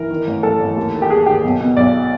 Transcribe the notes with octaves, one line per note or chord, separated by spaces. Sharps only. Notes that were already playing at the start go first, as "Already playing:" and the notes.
Already playing: E3 A#4
D#3
A1
A1 A4
A1
D#2
D#3
G4
D#2 G#4
D#3 G4
B1
B2
B1 D5